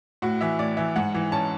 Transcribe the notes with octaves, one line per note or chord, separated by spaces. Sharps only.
A2 F#4
E3 E5
A2 D5
E3 E5
G#2 F#5
E3
C#4 A5